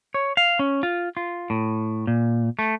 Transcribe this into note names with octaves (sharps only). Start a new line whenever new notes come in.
C#5
F5
C#4
F4
F4
A2
A#2
A3